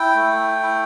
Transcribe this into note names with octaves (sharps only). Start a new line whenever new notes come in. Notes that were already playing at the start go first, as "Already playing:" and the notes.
Already playing: E4 G5
A3
E4